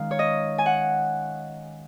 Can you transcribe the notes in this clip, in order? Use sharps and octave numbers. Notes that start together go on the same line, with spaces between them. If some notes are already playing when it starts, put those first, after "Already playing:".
Already playing: D#3 G#3 C#4 F5
C#5
D#5
G#5
F#5